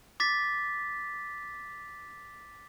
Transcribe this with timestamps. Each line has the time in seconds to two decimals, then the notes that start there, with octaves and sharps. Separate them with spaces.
0.20 D6 A6 B6